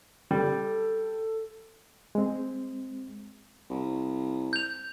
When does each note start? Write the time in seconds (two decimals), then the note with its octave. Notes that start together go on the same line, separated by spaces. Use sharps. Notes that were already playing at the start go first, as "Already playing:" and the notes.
0.31 G3 A4
2.15 G#3 C4
3.70 C2
4.53 G6 F7